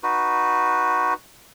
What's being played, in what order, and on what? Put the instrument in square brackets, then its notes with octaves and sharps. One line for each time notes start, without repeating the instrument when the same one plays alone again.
[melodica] D#4 F#4 B4